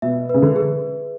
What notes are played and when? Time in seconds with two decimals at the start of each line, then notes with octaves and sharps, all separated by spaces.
0.02 B2 E5
0.29 C#3 B4
0.42 D3
0.56 G#4